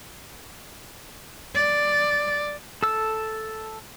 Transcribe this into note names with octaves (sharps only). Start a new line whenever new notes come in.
D5
A4 E6